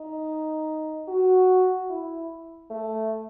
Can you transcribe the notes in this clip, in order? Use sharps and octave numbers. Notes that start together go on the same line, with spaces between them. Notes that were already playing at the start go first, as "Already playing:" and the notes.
Already playing: D#4
F#4
E4
A3